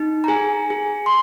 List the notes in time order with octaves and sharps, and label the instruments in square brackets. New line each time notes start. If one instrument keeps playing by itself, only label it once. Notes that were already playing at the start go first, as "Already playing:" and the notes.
Already playing: [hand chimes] D#4
A#5
G#4 G#5
G#4
C6